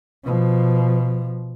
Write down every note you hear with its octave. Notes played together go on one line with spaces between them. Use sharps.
B2 F3